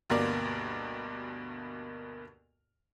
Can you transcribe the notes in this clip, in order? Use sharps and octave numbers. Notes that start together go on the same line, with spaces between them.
D2 G2 B2 A#3 A#4 D5